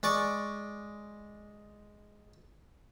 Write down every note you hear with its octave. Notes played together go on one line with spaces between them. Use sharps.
G#3 D5 C#6 D6